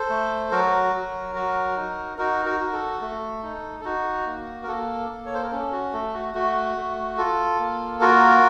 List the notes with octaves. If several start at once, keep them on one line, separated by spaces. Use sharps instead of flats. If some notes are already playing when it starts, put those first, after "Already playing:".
Already playing: A4 C5
A3
F#3 F#4 A#4
F#3
F#4
D#4
D#4 F#4 A#4
F#4 A#4
F#4
A4
A3 A4
D#4
A4
D#4 F#4
A#3
A#4
A#3 A4
A#3
C#5
C5
A#4
C#4 A4
F#4
A3 A4
F#4
A3 F#4
A3
F4 A4
A#3
F4 F#4 A#4